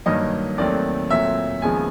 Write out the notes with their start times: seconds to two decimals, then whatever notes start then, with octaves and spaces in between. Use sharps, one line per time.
0.06 G2 D#3 F#3 A#3 D#5
0.58 D#2 D#3 F#3 A3 C4 D5
1.10 A#2 F#3 A3 C4 E5
1.62 D#2 C#3 F3 G#3 B3 G#5